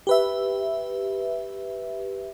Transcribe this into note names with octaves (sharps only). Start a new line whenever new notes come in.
G4 B4 E5